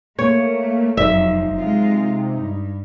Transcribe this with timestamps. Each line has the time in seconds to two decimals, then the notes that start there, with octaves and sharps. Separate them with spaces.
0.19 A3 A#3 C#5
0.97 F1 F#2 F3 D#4 E5
1.57 C3 G#3 F4
2.34 G2